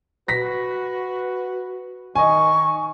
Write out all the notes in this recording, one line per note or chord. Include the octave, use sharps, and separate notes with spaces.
F#4 B4 A#6 B6
D#3 D#5 G#5 C#6